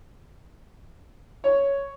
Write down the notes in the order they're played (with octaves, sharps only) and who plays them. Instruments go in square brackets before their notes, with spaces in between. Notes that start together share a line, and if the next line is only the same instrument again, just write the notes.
[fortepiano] C#5